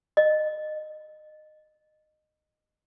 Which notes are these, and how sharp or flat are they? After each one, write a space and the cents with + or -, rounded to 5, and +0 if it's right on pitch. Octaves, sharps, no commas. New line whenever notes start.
D#5 -20